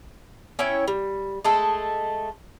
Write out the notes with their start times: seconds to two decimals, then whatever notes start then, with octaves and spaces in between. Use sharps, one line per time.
0.59 C#4 E4 C#5 G5
0.88 G3
1.45 G#3 A3 A4